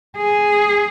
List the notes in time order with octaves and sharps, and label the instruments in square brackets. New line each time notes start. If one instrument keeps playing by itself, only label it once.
[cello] G#4